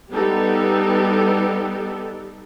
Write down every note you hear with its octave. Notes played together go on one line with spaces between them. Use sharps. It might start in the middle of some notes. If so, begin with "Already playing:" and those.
G3 B3 D#4 G4 A4